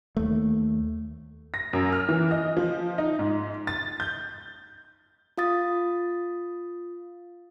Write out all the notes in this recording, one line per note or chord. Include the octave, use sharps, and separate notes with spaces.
D#2 A3
A#6
F#2
F6
E3
D#5
F3
D#4
G#2
A6
G6
F4 F5 D#6 A6